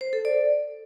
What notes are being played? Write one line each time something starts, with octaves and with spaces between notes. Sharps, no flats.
C5
A4
D5